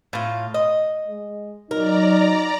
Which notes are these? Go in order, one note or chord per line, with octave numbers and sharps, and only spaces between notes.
A2 F4
D#5
G#3
F#3 D#4 A#4 D5 A#5